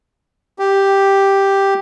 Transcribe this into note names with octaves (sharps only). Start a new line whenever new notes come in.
G4